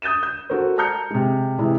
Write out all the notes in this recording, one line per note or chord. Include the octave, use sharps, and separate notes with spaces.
D#6 G6 A6 D#7 E7
G6
F#4 A4 A#4 C5
A5 A#5 F6 G6 C#7
C3 G#3
C3 E3 G#3 E4